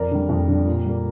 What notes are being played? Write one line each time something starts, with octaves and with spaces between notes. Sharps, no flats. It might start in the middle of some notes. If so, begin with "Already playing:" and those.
Already playing: F2 A#4 D5
D3 G3
F2
D3 G3
A#2
G3 A#3